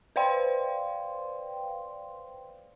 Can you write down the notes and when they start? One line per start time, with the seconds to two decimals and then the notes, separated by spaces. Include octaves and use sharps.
0.16 B4 C5 D5 F5 G5 C6